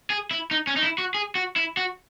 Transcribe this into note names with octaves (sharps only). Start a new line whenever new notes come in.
G#4
E4
D#4
C#4
D#4
E4
F#4
G#4
F#4
E4
F#4